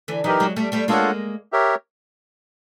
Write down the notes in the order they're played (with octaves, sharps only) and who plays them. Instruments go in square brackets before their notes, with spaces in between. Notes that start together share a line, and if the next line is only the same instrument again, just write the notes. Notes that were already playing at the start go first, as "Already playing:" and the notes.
[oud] D3 E3
[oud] E3 F#3 [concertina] D#4 G4 A#4
[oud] F#3 G#3
G3 A3
G3 A3
[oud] G#3 A#3 [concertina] D4 F4 A4 C#5 F#5
[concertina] G4 A#4 C#5 E5